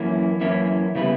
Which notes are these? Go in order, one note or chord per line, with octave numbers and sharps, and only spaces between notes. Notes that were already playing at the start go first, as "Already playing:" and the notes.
Already playing: F#2 E3 A#3 C#4 E4
F#2 E3 A#3 C#4 E4
C#3 G3 B3 E4 B4